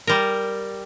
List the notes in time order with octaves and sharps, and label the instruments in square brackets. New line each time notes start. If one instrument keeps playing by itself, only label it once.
[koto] G3 A#4